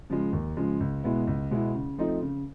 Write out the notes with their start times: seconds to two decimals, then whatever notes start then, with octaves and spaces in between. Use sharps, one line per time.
0.10 C#3 F3 G#3
0.33 D#2
0.57 C#3 F3 G#3
0.80 C#2
1.04 B2 G#3 B3 E4
1.27 C#2
1.51 B2 G#3 B3 E4
1.75 C#3
1.98 F3 A3 C4 D#4
2.22 C#3